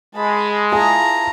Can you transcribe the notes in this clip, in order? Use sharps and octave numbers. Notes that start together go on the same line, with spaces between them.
G#3 A5 B5
E4 F4 G#4 A5 A#5